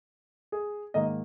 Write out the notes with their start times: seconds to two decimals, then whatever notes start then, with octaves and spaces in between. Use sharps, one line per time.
0.52 G#4
0.94 G#2 D#3 A#3 D#5